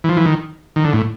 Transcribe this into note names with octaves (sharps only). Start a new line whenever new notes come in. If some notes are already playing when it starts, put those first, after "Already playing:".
E3
F3
E3
D#3
D#3
D3
A2